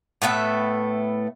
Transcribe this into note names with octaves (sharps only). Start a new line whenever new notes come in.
A2 A3 B3 E5